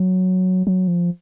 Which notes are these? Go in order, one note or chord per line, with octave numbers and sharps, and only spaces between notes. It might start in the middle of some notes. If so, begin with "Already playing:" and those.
Already playing: F#3
F#3
F3